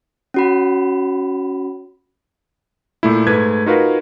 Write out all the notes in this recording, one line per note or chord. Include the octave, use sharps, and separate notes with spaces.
C#4 F#4 B5
A#2 A3 E4
G#2 A3 B4 G#6
D#4 F4 F#4 A#4 B4 F5